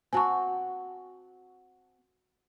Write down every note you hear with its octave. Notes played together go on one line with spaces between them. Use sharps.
C4 F#4 G#5 A5 C#6